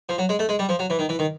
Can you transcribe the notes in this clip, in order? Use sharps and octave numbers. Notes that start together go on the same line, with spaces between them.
F3
F#3
G#3
A3
G#3
G3
F3
F#3
E3
D#3
E3
D#3